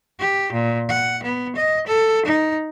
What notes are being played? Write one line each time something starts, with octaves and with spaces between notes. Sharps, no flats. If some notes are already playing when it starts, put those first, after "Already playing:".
G4
A#2
F#5
B3
D#5
A4
D#4